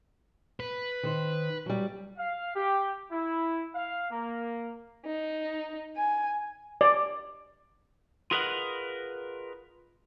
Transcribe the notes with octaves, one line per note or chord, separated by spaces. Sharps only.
B4
D#3 C5
F#3 G3
F5
G4
E4
F5
A#3
D#4
G#5
D5
F4 G#4 A#4 B4 D#5 F#5